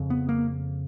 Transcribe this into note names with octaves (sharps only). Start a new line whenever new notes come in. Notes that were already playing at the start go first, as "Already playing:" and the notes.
Already playing: F2 C#3
B3
A#3